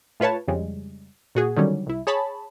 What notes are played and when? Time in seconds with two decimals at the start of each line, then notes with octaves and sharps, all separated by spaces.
0.20 A2 F4 B4 C#5 A5
0.48 F2 C#3 G3 G#3
1.35 A#2 F#4 G#4
1.57 D3 D#3 F#3 G3 C#4
1.86 C2 E4
2.07 G#4 C#5 A5 B5